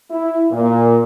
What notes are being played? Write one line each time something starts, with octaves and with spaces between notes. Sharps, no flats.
E4
A#2